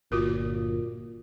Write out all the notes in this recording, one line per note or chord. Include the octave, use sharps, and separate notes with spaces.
G1 A#2 F4 F#4 A#4